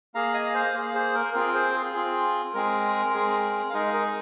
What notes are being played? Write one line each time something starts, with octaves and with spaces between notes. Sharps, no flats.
A#3 G#4 F5 A#5
D#5 G#5
C5 F5
A#3 G#4
G#4 C5
A#4
C4 F4 G#4 A#4
G#4 C5
G#4
C4 F4 G#4
G#3 C4 G#4 A#4
G#3 C4 G#4
F5
G#3 D#4 G#4 A#4 D#5
A#4 D#5